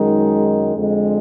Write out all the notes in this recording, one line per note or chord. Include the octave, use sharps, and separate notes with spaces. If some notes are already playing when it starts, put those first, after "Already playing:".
Already playing: F#2 D#3 G#3 D#4
F2 D3 G#3